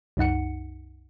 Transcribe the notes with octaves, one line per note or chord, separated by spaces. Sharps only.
C2 F#2 D#4 F#5 C#7